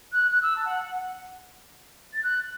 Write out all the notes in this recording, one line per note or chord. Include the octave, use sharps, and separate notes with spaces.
F#6
F#6
E6
A5
F#5
F#5
A6
F#6